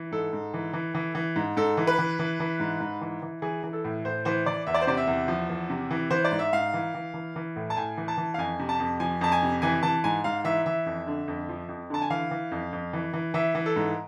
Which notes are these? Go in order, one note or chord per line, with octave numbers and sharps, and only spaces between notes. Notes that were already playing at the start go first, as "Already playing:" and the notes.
Already playing: E3
G#2 A4
G#2
E3
E3
E3
E3
G#2
G#2 A4
E3
B4
E3
E3
E3
G#2
G#2
E3
E3
E3 G#4
E3
A4
A2
A2 C5
E3 C5
E3 D5
E2 E5
D5
C5
C3 D5
E5
E2
F3
E2
C3
E3
E3 C5
D5
G#2
E5
G#2 F5
E3
E3
E3
E3
A2
A5
A2 G#5
E3
A5
E3
F5
F2 G#5
C3
A5
F2
F3 G#5
F2 A5
G#5
C3
E3 G#5
E3 A5
G#2 G#5
G#2 F5
E3 E5
E3 E5
F2
D3
F2
F3
F2
D3 A5
G#5
E3 F5
E3
F2
F2
E3
E3
E3 E5
E3
A4
G#2